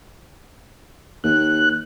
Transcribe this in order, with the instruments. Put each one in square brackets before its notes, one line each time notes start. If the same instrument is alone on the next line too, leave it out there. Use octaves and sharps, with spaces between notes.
[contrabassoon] D#2 [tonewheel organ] F#6